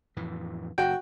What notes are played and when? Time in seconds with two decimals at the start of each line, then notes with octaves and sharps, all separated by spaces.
0.16 F2 A2 E3
0.78 F#1 F#4 G5